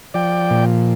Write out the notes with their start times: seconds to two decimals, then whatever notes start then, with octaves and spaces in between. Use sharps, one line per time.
0.14 F3 D5 G5
0.50 A#2